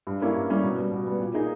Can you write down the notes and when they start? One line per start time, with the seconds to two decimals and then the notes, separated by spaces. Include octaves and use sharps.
0.07 G2
0.22 G3 A#3 C#4 E4
0.36 G2
0.49 G3 A#3 C#4 E4
0.64 B2
0.77 G3 B3
0.92 B2
1.07 G3 B3
1.20 A#2
1.34 A#3 D#4 G#4